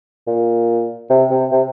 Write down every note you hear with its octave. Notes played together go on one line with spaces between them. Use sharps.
A#2
C3
C3
C3